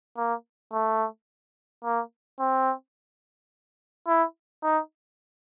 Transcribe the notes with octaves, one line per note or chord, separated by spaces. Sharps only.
A#3
A3
A#3
C4
E4
D#4